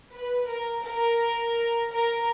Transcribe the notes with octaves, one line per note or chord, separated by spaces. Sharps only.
B4
A#4
A#4
A#4